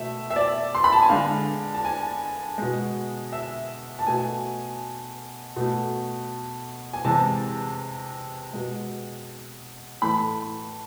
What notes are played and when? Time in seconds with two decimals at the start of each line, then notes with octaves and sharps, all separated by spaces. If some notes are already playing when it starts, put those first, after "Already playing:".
Already playing: B2 A3 E5
0.30 E5
0.36 D5
0.75 C6
0.84 B5
0.93 A5
1.02 G#5
1.09 D3 G#3 F5
1.75 A5
1.85 G#5
2.58 B2 G#3
3.32 E5
3.99 A5
4.07 B2 A3 G#5
5.56 B2 A3
6.93 G#5
7.05 C3 E3 G#3 A5
8.53 B2 G#3
10.01 A2 E3 A3 B5